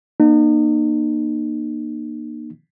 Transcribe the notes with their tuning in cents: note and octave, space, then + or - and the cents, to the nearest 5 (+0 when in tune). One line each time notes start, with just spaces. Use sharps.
A#3 +20 D#4 -40